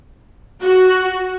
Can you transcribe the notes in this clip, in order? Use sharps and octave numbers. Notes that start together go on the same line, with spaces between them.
F#4